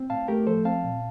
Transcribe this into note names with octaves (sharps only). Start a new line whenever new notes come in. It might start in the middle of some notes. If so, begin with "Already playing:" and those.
Already playing: C4
A2 F5 A5
A3 G4 A#4
F3 A4 C5
C4 F5 A5
A#2